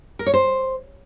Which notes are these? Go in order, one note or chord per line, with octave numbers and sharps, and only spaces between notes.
A#4
C#5
C5